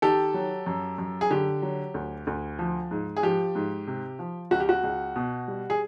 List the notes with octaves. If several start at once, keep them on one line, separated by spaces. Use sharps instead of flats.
D#3 G4 A4
F#3
F#2
F#2
G#4
D3 G4
F#3
D2
D2
F3
G#2
G#4
F3 G4
G#2
C3
F3
C#2 F#4
G4
F#4
C#2
B2
G3
G#4